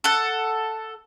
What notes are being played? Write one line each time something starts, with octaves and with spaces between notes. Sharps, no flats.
A4 F#5